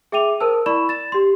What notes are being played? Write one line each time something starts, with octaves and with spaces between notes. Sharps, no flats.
G#4 E5 G5 D6 D#7 F7
A#4 C5 A5 E6
E4 D5 B5 C#6 E7
A6 E7
G4 C6